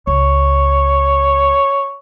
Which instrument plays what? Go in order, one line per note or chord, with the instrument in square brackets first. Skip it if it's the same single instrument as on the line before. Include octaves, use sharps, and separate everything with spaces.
[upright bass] C#2 [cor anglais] C#5